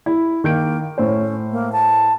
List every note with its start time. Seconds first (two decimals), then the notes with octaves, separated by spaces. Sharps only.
0.06 E4
0.44 D#3 A#3 G6 D7
0.98 A2 C#4 C5
1.51 A#3
1.72 A5